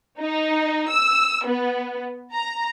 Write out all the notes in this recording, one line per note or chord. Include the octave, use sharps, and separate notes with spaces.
D#4
E6
B3
A#5